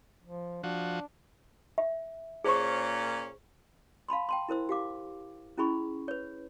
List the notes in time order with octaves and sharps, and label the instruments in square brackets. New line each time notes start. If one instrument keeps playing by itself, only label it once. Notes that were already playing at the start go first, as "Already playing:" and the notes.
[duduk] F3
[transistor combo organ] F3 F#4 [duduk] D4
[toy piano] E5
[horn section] A#2 C#4 [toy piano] G#4 C5 C#6
[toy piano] F5 A5 B5 C6
G5 A5 C6
E4 A#4 C5 E6
G4 F5 D6
C#4 E4 G#4 B5 C#6
B4 C#5